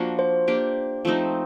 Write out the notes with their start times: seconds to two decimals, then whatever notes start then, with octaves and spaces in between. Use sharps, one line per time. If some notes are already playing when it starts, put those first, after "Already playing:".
Already playing: F3 A#3 D4 F#4
0.19 C5
0.48 A#3 D4 G4
1.05 F3 A3 C4 D#4